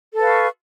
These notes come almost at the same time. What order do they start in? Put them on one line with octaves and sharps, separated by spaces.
A4 B4 F5 C#6